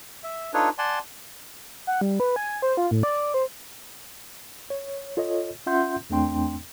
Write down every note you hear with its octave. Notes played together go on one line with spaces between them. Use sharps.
E5
D4 D#4 F4 A4 B4 C#5
D5 F#5 G#5 A5 C6
F#5
G3
B4
G#5
C5
F4
A2
D5
C5
C#5
F4 A4 C#5 D#5
C#4 F4 E5 F#5 C6 G6
E2 A3 C4 D4 G5 C6